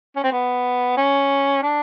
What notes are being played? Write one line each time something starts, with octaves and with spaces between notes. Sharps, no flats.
C#4
C4
B3
C#4
D4